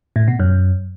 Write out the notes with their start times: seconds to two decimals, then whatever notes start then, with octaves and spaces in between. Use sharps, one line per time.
0.16 A2
0.28 B2
0.40 F#2